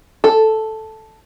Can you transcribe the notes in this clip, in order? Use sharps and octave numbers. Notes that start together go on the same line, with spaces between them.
A4